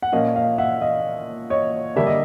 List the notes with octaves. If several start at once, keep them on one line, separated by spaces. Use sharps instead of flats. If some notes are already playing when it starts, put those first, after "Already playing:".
F#5
A#2 F3 A#3 C#4 D#5 F5
D#5 F5
E5 F#5
D#5 F5
C#5 D#5
D3 G3 A#3 D4 E5
D#5